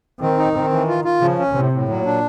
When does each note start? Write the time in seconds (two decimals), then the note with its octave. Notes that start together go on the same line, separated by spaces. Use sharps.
0.21 D#3 C4
0.38 D#4
0.55 D#3 C4
0.71 E3
0.88 F4
1.04 F4
1.21 C#3 F3
1.39 C#4
1.55 A2 C3
1.72 A2
1.88 A#2 F#3
2.06 D4